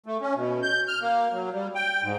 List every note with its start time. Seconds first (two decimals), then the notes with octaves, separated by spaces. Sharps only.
0.06 A3
0.21 C#4
0.35 B2
0.63 G6
0.88 F6
1.01 A#3
1.32 F#3
1.53 G3
1.75 G5
2.03 G#2